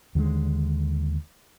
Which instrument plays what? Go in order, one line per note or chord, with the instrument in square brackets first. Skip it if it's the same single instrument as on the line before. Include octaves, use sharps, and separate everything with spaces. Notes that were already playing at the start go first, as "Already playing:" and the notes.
[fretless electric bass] D#2 D3 F3 G#3